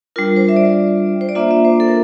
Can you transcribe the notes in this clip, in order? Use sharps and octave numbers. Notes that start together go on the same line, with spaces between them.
G3 D4 F4 A#4
C5
E5
D5
C5
D5
A#3 D4 F4 E5
E5
C5
A4
A#4